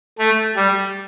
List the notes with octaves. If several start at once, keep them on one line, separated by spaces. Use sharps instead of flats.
A3
G3